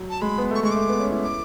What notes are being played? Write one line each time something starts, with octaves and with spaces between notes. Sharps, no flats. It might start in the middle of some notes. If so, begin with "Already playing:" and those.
Already playing: F#3
A5
G#3 B5
B3
A3 C#6
G#3 C#6
A3 D6
B3
C#4
E4
D6